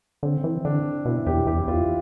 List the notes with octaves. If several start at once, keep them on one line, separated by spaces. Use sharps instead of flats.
D3 C4
E3
D3 D4
B2 E4
E2 G4
E2 G4
E4
E2 F4